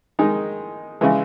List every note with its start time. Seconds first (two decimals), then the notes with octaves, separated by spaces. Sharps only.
0.19 D#3 G#3 D#4
1.01 C#3 E3 G#3